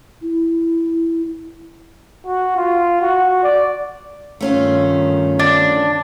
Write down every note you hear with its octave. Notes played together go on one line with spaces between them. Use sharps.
E4
F#4
F4
F#4
D5
G2 D#3 A3 C#4 F4
D4